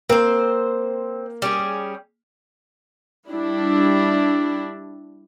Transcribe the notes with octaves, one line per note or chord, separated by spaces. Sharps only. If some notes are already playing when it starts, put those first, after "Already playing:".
A#3 C4 C5
G3 C#4 G#4
G3 D4 E4